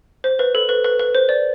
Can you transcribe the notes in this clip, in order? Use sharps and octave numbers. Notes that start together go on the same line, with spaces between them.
C5
B4
A4
B4
B4
B4
C5
D5